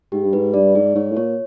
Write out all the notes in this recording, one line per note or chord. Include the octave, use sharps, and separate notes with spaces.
G#2 G4
G2
G#2 B4
G2 D5
G#2 G#4
G#2 C#5
A2
A#2 C#5